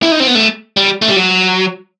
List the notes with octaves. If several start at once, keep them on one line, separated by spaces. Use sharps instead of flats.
E4
D#4
C4
B3
A3
G3
A3
G3
F#3